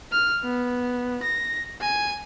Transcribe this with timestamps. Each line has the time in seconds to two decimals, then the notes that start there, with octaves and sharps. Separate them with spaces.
0.12 F6
0.44 B3
1.22 A#6
1.81 G#5